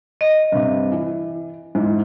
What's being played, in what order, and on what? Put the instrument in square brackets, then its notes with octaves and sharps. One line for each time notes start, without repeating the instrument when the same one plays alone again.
[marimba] D#5
[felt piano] G2 C3
E3
G#2 E3